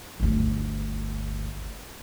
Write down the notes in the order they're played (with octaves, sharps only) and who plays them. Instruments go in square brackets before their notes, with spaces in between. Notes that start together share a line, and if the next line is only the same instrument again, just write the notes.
[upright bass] G1 D2